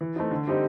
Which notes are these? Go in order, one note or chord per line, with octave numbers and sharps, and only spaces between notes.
E3
A3 C4 D#4
D3
G3 C4 D#4 G4